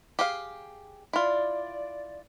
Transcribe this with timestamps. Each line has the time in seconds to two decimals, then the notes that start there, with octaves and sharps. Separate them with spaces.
0.19 G4 G#4 F5
1.13 E4 F4 D5